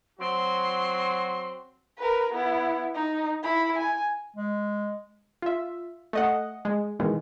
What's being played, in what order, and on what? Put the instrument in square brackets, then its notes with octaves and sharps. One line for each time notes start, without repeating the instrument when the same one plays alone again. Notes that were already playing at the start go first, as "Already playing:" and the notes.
[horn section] F#3 C4 F#4 [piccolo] C6
[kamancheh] A#4 B4
B3 E4
D#4
E4 B5
G#5
[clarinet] G#3
[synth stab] F4 E5
A3 D#5 F#5
G#3
B2 D#3 E3 G#3